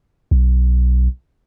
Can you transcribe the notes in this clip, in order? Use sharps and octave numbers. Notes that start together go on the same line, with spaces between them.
B1